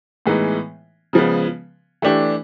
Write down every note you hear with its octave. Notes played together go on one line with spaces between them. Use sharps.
A2 E3 G#3 B3 D#4
C#3 F3 G#3 B3
E3 A3 D4 G4